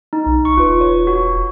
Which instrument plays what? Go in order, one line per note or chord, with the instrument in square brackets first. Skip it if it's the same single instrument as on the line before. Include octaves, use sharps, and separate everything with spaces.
[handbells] D#4
[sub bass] B1
[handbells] C#6
[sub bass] E1 [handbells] F4 B4
[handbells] C#5
F#4